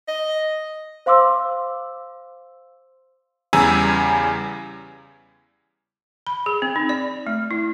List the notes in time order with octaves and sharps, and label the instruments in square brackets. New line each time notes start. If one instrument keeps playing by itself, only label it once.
[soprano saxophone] D#5
[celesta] C5 F5 C6 D6 E6
[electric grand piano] E2 C#3 G3 G#5 A#5 E6
[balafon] B5
G#4
C4
D#4
D5
A3
E4